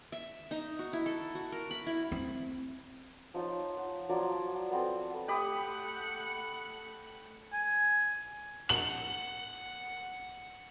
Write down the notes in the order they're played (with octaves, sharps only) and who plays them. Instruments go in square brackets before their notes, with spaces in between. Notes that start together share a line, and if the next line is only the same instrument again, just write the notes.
[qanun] E5
D#4
F#4
E4
A4
F#4
A#4
B5
E4
[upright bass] C4
[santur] F3 D#4 C#5 A5
F#5
F3 F#3 D5 A#5
B3 C4 A4
[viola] A3 F#5 [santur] G4 B5 D#6
[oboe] G#5
[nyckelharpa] F#5 [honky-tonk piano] F#7